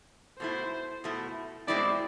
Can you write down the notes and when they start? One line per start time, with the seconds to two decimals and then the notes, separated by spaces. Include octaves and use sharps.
0.39 B2 A3 E4 C5
1.04 B2 A3 E4
1.68 B2 G#3 C4 E4 D5